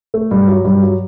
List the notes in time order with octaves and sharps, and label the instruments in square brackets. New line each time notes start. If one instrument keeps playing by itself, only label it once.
[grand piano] A3
G2
F#3
G2
F#3